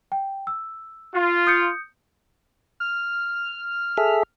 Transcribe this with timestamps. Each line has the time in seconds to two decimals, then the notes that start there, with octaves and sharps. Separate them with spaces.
0.12 G5
0.47 E6
1.14 F4
1.47 D#6 G6 C#7
2.80 F6
3.97 G#4 A4 E5